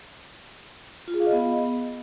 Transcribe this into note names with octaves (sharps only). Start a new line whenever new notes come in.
F4
G#4
F5
D#5
B3